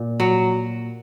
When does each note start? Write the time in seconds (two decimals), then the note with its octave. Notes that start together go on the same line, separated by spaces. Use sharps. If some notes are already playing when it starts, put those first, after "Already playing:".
Already playing: A#2
0.20 F#3